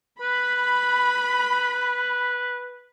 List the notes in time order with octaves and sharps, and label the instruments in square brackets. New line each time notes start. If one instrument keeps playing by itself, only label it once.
[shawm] B4 [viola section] B5